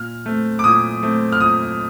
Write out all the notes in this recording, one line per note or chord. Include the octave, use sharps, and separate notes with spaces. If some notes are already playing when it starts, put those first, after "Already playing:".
Already playing: A#2 F6
A3 C4
D6
A#2 D#6
A3 C4
F6
A#2 D#6